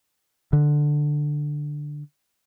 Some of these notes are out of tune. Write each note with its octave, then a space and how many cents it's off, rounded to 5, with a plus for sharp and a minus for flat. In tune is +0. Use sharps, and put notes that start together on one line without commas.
D3 +5